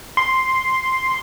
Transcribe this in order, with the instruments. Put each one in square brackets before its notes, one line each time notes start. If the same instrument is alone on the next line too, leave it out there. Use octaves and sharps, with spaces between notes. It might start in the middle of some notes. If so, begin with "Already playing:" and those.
[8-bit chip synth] C6